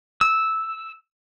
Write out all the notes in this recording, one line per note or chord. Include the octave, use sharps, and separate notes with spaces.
E6